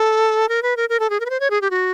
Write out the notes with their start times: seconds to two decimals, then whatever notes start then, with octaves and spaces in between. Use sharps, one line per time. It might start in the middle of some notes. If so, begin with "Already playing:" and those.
Already playing: A4
0.49 A#4
0.63 B4
0.77 A#4
0.89 A#4
1.00 A4
1.10 G#4
1.20 A#4
1.26 B4
1.30 C5
1.40 C#5
1.50 G#4
1.61 G4
1.71 F#4